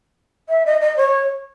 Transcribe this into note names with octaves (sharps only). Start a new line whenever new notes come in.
E5
D#5
D#5
C#5